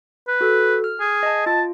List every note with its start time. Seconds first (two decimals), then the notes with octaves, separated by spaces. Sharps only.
0.28 B4
0.41 F#4 A4
0.84 F6
1.00 G#4
1.23 D#5 A5
1.46 F4 A5